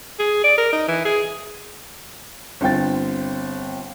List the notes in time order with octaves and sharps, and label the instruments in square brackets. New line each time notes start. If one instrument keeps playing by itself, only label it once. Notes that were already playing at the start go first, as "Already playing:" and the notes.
[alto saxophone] G#4
D5
A#4
D#4
E3
G#4
[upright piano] G1 C4 G5 A6